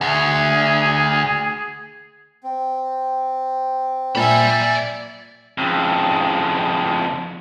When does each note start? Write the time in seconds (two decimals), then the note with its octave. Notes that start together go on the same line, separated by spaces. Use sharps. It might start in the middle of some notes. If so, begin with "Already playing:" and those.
0.01 D2 G#4
2.44 C4
4.15 A#2 D5 E5 G#5 B5
5.58 F2 C#3